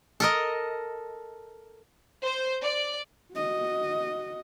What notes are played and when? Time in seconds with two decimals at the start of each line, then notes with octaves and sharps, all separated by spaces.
0.20 A4 A#4 D#5
2.23 C5
2.63 D5
3.34 F#4 D#5